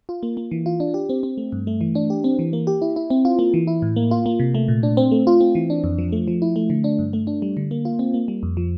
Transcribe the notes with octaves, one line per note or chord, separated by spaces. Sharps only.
F4
A#3
A#3
E3
F4
D4
G4
C4
C4
A3
G2
A3
E3
D4
G4
C4
E3
A#3
G4
E4
E4
C4
F4
A#3
E3
E4
A2
A#3
F4
A#3
C3
A3
A#2
D4
C4
A3
F4
C4
E3
D4
F2
F3
A3
F3
E4
A3
D3
D4
G2
A3
D4
G3
D3
A#3
F4
C4
A#3
G3
F2
F3